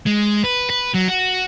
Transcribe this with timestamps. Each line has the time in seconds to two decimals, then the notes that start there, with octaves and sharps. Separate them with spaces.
0.06 G#3
0.44 B4
0.70 B4
0.94 F#3
1.08 F#4